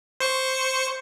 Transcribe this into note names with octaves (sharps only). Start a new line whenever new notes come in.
C5 C#6 C#7